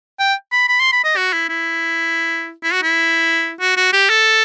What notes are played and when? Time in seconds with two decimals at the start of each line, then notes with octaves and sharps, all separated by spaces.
0.19 G5
0.52 B5
0.69 B5
0.80 C6
0.92 B5
1.04 D#5
1.17 F#4
1.33 E4
1.49 E4
2.63 E4
2.73 F#4
2.83 E4
3.60 F#4
3.77 F#4
3.93 G4
4.10 A4